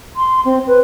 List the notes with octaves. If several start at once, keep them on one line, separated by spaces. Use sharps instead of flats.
C6
C4
B4